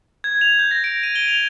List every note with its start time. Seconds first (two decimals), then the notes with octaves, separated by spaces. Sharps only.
0.24 G#6
0.41 F7
0.59 G6
0.71 A#6
0.84 D7
1.03 D#7
1.16 G7
1.28 F7